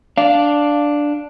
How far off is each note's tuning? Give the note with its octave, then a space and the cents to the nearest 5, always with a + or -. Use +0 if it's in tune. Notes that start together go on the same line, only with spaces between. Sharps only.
D4 +0 F5 +0